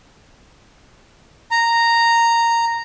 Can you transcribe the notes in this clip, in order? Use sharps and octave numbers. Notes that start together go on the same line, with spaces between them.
A#5